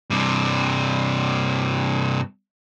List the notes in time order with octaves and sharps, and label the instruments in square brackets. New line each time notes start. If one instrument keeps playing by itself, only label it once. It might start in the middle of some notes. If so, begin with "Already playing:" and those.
[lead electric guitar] G2 C3